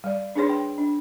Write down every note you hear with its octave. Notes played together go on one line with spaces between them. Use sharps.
G3 D5
D4 D#4 G#4 B4 C#5 C6
G5
D4